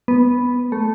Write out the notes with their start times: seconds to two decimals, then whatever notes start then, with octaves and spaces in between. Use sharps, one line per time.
0.08 B3
0.72 A3